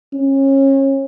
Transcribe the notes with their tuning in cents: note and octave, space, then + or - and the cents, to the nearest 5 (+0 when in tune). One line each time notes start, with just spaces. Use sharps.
C#4 -30